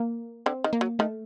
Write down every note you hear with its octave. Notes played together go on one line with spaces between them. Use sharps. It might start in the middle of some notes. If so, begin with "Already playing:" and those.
Already playing: A#3
D3 C4
D#3
A#3
F#3
D#3 A3